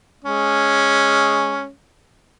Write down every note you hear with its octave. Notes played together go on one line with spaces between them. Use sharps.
G#3 C#4